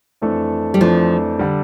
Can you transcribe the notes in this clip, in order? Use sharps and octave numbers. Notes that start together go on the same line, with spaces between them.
F2 E3 A3 D4 A4
G3
F2 E3 F3 A3 D4 A4
D3 G3